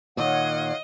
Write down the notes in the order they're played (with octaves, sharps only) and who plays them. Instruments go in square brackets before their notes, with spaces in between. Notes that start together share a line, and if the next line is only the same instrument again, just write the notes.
[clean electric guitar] A#2 D#3 [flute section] C#5 F5 F#5 [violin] D#5